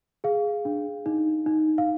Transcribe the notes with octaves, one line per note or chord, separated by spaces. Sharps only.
G#4 F5
D4
D#4
D#4
F5